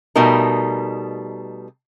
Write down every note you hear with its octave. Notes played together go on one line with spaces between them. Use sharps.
B2 G3 A3 D#4 A#4